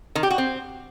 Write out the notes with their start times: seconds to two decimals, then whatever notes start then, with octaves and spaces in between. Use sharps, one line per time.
0.15 D#3
0.23 G4
0.30 F#4
0.38 C4